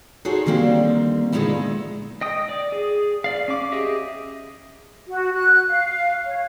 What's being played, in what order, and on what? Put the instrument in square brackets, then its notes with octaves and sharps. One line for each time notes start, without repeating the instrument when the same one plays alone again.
[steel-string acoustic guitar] D#4 F#4 G#4 A4 C5 C#5
D3 D#3 G3 A#3 C4
A#2 D3 G#3 B3 D#4 E4
[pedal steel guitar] D#5 G5 D#6
D5
G#4
D5 F5
C#4 D6
G4 G#4 D#5 E5
[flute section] F#4
F#6
F5
C#5